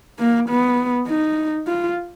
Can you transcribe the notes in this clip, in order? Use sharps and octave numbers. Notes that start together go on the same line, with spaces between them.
A#3
B3
D#4
F4